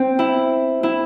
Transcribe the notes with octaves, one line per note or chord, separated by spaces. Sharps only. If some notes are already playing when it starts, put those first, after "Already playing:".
Already playing: C4
E4
E4